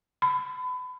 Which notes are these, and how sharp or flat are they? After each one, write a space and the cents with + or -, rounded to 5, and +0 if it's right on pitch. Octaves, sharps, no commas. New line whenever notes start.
B5 +30